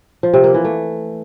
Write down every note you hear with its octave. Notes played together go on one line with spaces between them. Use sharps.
F3
C3
A#3
E3
A3